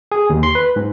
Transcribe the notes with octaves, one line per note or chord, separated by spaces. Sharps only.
G#4
D#2
C6
B4
G#2